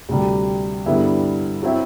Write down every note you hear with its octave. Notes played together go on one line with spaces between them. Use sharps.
D2 C3 G3
G2 D3 G3 B3 E4
F#3 C4 E4